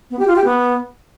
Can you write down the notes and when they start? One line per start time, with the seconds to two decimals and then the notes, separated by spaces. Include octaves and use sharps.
0.11 B3
0.19 G4
0.28 F4
0.36 G4
0.45 B3